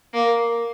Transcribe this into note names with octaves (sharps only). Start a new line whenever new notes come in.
A#3